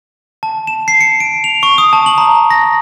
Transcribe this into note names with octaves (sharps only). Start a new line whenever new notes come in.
A5
E7
C7
C#7
D7
F7
C#6
D#6
A5
F#7
A#5
A#6